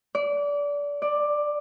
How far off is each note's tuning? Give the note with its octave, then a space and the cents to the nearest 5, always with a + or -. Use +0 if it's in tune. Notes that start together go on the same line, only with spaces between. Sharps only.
D5 -25
D5 +10